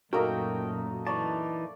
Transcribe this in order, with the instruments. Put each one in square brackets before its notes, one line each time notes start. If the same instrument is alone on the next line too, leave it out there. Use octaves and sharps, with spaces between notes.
[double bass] F#2 A#2 [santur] A3 A#3 D#4 [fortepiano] F#4 A#4 [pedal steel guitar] G5
[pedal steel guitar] E3 D#4 A5 [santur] D5 C#6